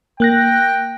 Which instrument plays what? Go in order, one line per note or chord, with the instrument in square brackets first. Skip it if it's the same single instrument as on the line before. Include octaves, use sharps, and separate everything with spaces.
[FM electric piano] A#3 F#6 A#6 [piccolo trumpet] G5